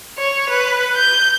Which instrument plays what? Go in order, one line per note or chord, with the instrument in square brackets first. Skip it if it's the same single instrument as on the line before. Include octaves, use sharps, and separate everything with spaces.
[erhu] C#5
B4
G6